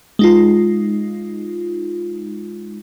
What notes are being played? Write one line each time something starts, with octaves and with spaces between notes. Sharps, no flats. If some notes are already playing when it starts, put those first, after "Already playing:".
G#3 D#4 F4